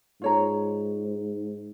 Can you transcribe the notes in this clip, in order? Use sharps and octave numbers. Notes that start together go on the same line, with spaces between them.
G#2 F4 C#5 A#5